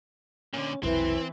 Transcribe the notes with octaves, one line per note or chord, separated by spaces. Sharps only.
A#2 D3 C#4
F1 B1 E3 F#3 C4 E4